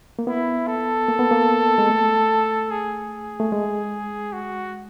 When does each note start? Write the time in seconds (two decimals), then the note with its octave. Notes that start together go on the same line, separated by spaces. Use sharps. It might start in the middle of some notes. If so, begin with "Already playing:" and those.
0.19 A#3
0.27 B3 E4
0.67 A4
1.08 A#3
1.19 B3
1.31 A#3
1.78 G#3
1.90 A3
2.71 G#4
3.40 A3
3.52 G#3
4.33 F#4